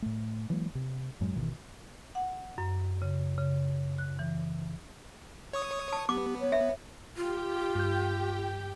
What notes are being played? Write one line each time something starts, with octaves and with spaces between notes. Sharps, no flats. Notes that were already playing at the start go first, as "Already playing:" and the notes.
A2 A3
E3 F#3 G#3 A#3
C3
F#2 A2 F#3 G#3
G#1 B2 D#3 E3
F#5
F#2
C#3
C#3
F#6
E3
C#5 C#6 D#6
A5
B3 G4 D6
C#5
E5
F4 G4 G5
G2 G6